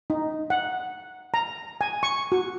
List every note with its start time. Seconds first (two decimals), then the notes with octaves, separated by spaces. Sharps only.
0.10 D#4
0.50 F#5
1.34 A#5
1.81 G#5
2.03 C#6
2.32 F#4